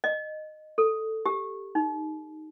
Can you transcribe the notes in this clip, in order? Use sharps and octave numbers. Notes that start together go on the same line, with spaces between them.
D#5
A4
G4
D#4